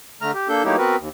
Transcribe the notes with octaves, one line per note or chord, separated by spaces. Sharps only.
D3 A3 A#5 F6
G4
A#3 D4 A4 G6
F#3 A3 A#3 D#4 E4 G4
B3 C4 F#4 A#4 B4
D#2